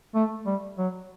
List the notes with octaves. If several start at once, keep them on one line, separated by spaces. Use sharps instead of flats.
A3
G3
F#3